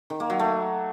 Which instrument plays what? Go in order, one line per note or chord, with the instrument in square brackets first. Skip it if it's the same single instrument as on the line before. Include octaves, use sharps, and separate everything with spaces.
[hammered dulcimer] D#3
A#3
F#3
A3